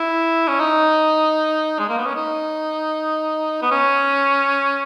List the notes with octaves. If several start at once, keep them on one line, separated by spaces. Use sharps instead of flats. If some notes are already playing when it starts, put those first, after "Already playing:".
Already playing: E4
C#4
D#4
G#3
A#3
B3
C#4
D#4
B3
C#4